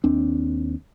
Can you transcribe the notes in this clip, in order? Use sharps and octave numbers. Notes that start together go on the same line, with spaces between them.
D#2 C4 D4